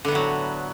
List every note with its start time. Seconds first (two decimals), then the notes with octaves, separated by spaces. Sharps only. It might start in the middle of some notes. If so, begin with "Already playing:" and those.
0.05 D3
0.08 B3
0.12 A2
0.15 F#3